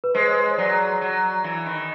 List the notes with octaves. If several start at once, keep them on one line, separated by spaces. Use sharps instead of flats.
B4
G#3 C5
C#5
C5
C#5
F#3 D5
F#3
E3
D#3